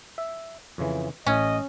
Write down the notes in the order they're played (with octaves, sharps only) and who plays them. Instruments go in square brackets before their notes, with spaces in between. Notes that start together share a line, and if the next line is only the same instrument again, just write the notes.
[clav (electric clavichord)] E5
F2 C#3 E3
[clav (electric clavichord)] A1 A2 [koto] C#4 [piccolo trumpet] D#5